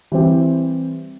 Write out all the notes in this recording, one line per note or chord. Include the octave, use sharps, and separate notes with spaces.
E3 G3 C4 G4